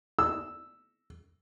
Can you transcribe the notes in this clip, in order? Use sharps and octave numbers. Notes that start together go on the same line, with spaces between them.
E6